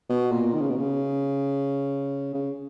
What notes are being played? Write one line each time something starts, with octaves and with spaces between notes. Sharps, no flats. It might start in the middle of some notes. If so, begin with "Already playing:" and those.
B2
A#2
D#3
C#3
B2
C#3
C#3